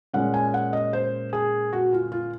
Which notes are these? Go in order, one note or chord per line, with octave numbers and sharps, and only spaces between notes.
A#2 G#3 C#4 F#5
G#5
F#5
D#5
C5
G#4
F#4
F4
F4